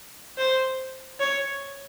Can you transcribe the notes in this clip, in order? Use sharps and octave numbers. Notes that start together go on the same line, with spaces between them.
C5
C#5